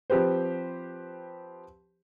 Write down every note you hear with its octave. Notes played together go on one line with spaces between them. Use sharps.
F3 C4 G4 B4 C5